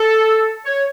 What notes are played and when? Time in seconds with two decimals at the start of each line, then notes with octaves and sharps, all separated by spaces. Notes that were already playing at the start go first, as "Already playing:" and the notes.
Already playing: A4
0.65 C#5